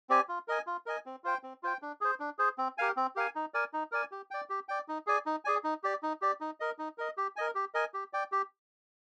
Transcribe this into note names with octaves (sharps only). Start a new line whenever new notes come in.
C4 G4 D5 G#5
F4
A#4 D#5 G#5
F4
A#4 D#5 G#5
C4
F4 C5 G5
C4
F4 C5 G5
D4
G#4 C5
D4
G#4 C5
C4
G4 A#4 F5 G#5
C4
G4 A#4 F5 G#5
D#4
A#4 D5 G#5
D#4
A#4 D5 G#5
G4
D5 G5
G4
D5 G5
D#4
G#4 D5 G#5
D#4
G#4 D5 G#5
D#4
G4 D5
D#4
G4 D5
D#4
A#4 D#5
D#4
A#4 D#5
G4
A#4 D#5 G#5
G4
A#4 D#5 G#5
G4
D5 G5
G4